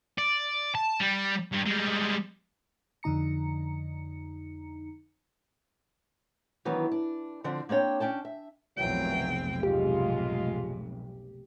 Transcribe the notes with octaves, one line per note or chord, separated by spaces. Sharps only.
D5
A5
G3
G2
G3 G#3
F2 D3 D#4 A#5 C#7
D#3 E3 F#3 B3 D4
D4
D3 F3 C4 D4
A#3 C4 D4 C#5 G5
C#4 D4 G5 A5
E5
F1 B1 A#2 E3 F#3 C4 G5
G#2 G#3 F4 G4